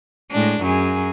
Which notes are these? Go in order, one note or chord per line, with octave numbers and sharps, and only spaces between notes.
A2 G#3 D4
F#2 F#3 G#4